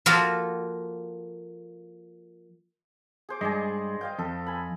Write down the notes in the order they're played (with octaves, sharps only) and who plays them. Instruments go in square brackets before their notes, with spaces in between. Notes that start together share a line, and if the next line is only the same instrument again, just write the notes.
[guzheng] F3 A#3 F4 F#4 A4
[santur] G#4 C5 D6
[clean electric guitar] G2 G#3 [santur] G#4 D5 D#5
[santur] D#5 F5 G5
[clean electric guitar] F2 [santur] A4
[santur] G#5 B5